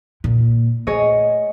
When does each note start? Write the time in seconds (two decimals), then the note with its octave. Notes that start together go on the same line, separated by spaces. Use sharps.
0.24 A#2
0.87 A3 G#4 C#5 D#5